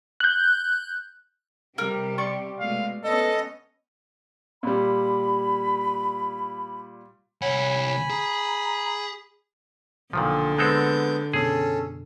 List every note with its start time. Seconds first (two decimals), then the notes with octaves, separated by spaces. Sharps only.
0.20 F#6 G6
1.78 C3 G3 G4 A#4
2.18 D5 C6 C#6
2.60 B2 G#3 A3 F5
3.04 B3 C#4 A4 D#5
4.63 A#2 G3 B5
7.42 C2 C#5 F#5 G#5 B5
8.10 G#4 A#5
10.13 B1 A#2 D3 D#3 F3
10.58 G#3 B3 C4 A4 G6
11.34 F#1 B2 B3 C#4 G#4 A4